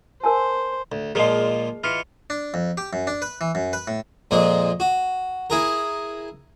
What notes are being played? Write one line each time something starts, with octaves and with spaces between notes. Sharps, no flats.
A#4 C5 G#5 A5
D2
A#2 F3 G#3 G#4 D#5
E3 F4 F6 C#7
D4
F2
G4
F#2
D4
B4
E3
F#2
B4
A2
F2 A#2 G#3 A#3
F#4
E4 G#4 A#4